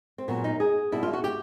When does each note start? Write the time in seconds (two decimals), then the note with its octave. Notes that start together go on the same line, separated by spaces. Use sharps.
0.18 C4
0.28 A#2 F#3 B3
0.44 D#4
0.60 G#4
0.92 B2 G3 E4
1.03 F4
1.13 F#4
1.24 G4